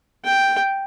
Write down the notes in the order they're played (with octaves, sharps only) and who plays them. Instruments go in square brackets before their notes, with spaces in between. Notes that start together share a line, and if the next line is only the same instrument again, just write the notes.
[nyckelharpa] G5